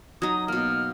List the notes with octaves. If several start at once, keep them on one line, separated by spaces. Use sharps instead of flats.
F#3 D#4 D#6
B2 A#3 F6